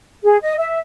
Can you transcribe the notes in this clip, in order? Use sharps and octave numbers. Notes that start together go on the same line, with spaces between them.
G#4
D#5
E5